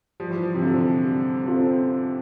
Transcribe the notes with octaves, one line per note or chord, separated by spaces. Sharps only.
F3 G3
E3
F3
C3
D3 C4 F4 A4 C5
G3
C4 F4 A4 C5